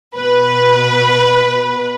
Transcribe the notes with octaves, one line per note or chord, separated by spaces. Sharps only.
B2 B4